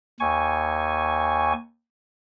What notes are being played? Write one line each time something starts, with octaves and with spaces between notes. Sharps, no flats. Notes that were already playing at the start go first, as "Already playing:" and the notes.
D#2 G#5 C#6